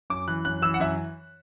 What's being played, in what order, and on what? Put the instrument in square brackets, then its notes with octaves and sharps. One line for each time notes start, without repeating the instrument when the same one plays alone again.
[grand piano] F#2 D6
E3 F#6
F#2 F#6
E3 E6
F#5
F#2 E5